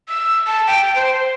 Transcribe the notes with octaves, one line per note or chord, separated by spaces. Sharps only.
E6
A5
G5
C5
C5